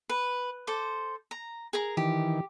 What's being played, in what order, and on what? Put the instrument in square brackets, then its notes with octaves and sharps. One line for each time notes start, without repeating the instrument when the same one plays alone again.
[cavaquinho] B4
A4 C5 D6
A#5
G#4 A#4 A#5
[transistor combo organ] D#3 E3 [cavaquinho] G4